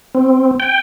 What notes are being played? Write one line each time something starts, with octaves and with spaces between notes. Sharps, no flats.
C4
G5